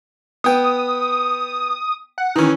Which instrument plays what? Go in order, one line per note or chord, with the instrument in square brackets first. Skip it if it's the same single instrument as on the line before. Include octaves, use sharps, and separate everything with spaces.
[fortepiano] B3 G5 [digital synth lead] D#6
[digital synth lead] F#5
[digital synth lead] D#3 [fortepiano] E3 C#4